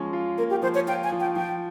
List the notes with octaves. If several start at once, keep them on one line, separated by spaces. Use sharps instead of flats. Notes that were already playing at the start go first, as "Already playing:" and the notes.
Already playing: F3 G#3 C#4
F4
A#3 A#4
G4
F3 C5
C#5
F4 G5
G#5
F3
G5
F3 G5